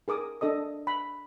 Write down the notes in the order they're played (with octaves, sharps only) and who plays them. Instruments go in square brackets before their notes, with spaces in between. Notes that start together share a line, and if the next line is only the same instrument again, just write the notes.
[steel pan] G#4 A#4 D6 D#6
D4 A4 D#5 D#6
B5